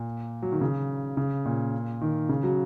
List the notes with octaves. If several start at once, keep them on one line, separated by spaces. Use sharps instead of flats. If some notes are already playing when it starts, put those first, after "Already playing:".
Already playing: A#2
F#3
D#3
C#3
C#3
A#2
D#3
C#3
F#3